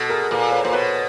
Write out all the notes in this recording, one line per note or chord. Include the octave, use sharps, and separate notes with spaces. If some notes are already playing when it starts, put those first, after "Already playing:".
Already playing: B2 A4
G#4 A#4
A#2 A4 B4
B4 C#5
A#2 C5
B2 B4 C#5